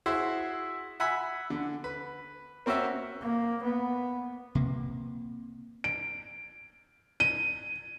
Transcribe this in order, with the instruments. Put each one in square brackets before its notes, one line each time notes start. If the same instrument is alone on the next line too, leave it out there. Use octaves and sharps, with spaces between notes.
[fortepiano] E4 F#4 G#4 C5
E5 F#5 G#5 B5 E6
D3
B4
A#3 C4 C#4 F#4 E5
[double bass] A#3
B3
[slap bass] C3 A#3
[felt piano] D7
D#7